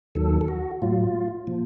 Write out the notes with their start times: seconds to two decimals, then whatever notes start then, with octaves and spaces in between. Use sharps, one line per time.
0.15 D#2 D#3 F#3 A4
0.41 A4
0.48 F#4
0.82 A2 F#3 F4
1.47 A#2 F3